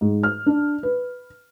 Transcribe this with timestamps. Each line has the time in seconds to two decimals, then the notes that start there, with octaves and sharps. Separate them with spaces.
0.01 G#2
0.23 F6
0.46 D4
0.83 B4